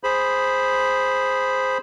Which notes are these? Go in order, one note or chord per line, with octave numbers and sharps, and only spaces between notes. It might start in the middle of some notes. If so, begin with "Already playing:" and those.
G#4 C5 B5